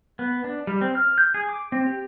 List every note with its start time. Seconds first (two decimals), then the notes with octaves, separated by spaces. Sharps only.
0.19 B3
0.44 D4
0.67 G3
0.81 C4
0.95 F6
1.18 G6
1.34 G#4
1.49 D6
1.72 C4
1.86 G4